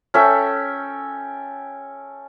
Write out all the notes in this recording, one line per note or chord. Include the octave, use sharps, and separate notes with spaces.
C#4 A4 E5 G5